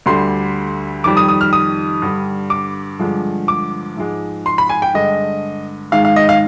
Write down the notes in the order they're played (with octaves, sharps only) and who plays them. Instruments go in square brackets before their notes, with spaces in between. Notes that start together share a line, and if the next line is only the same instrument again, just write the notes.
[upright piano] D2 D3 G3 C6
F2 D#3 G3 D6
D#6
D#6
F6
D#6
G2 D3 G3
D6
G2 D3 F3 G#3
D6
G#2 F3 G#3
C6
B5
G#5
G5
G2 D3 G#3 D#5
G#2 D#3 G#3 F5
F5
D#5
F5